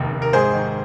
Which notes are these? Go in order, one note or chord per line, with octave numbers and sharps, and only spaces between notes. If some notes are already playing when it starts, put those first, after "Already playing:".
Already playing: F1 D#2 D#3
F1
A#4
G#2 G#4 C5
D#3